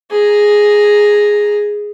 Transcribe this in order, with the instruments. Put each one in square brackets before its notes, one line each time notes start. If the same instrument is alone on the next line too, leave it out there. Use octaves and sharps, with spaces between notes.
[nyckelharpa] G#4 A#5